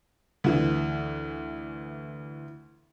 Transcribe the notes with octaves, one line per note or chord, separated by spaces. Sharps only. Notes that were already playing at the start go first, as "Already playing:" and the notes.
D2 E3